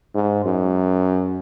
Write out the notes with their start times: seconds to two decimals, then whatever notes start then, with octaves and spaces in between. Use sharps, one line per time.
0.15 G#2
0.45 F#2